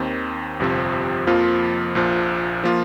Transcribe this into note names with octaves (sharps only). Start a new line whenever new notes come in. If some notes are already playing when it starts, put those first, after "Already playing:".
Already playing: D#2 D#3 C4
G1 F2 C3 F3 C4
F2 F3 A#3 F4
A#1 A#2 F3
F3 A#3 F4